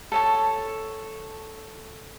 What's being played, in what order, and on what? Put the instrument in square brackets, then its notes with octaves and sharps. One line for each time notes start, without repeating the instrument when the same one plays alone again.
[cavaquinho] A4 C#5 A5